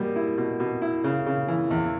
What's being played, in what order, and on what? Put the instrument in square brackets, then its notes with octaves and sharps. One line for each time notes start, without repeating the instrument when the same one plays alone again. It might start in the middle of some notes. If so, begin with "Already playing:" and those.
Already playing: [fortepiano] B2 G3 [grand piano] A#3
[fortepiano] E4
B2
B2
E4
C#3
C#3
E3
E2